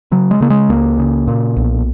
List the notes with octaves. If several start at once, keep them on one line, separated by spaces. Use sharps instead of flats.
C#3 F#3
G#3
C#3 A#3
G#3
C#2 A#3
C#3
A#2
B1